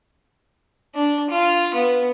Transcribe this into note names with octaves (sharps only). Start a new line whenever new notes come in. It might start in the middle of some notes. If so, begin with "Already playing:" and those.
D4
F4
B3